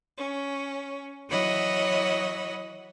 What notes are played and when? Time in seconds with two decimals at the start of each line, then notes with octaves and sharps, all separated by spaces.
0.18 C#4
1.29 E3 F#3 C#5 D#5 F#5 B5